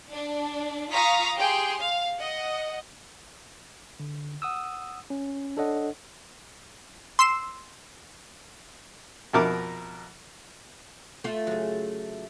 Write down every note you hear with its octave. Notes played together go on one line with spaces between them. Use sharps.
D4
F4 F5 A#5 C#6 D#6 B6
G4 G#4 G5 C6
F5
D#5 F#5
D3
F#5 D#6 E6
C#4
D4 A4 C#5 D#5 F#5
C6 E6 C7 E7
F2 B2 A#4 E5 D6
A3 F4
C#3 F#3